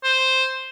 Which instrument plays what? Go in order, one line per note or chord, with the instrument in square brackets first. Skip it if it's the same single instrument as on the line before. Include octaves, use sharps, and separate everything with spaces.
[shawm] C5